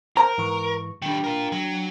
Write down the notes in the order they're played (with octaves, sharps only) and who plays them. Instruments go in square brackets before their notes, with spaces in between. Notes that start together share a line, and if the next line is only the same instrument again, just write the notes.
[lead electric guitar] A#4 [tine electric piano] C5 [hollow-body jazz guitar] A#5
[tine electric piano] G#2 E3 C#6
[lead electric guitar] D#3 G3 [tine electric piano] D4 G5
[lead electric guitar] F4 A#4
F#3